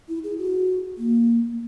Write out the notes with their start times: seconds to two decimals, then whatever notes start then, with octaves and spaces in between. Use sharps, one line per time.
0.08 E4
0.24 G#4
0.38 F#4
0.98 A#3